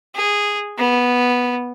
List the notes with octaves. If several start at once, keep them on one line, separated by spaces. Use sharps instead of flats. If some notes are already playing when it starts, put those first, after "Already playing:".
G#4
B3